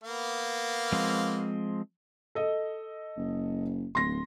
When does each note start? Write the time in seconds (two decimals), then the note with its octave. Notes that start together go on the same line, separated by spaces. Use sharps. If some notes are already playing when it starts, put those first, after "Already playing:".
0.04 A#3 B3 F5
0.92 F3 G#3 C4
2.35 A4 D#5
3.17 F#1
3.95 D1 C6 A#6